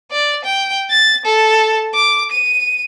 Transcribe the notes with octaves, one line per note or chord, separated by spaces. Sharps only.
D5
G5
A6
A4
D6
D#7